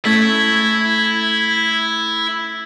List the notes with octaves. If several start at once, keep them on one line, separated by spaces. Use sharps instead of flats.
A3 C#4 E4 C#5 G#6 A6 B6